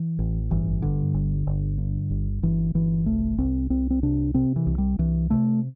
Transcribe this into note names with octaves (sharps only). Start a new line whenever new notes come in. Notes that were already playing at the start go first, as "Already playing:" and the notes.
Already playing: E3
A1
G1 E3
G2 D3
G1
G1
G2
G1
G1 E3
G1 E3
C2 A3
C2 C4
C2 C4
C4
C3 D4
C3 C4
E3
C2
G3
C2 E3
C3 A3